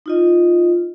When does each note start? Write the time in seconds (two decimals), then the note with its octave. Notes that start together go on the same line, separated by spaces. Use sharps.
0.06 D#4 F4 D#5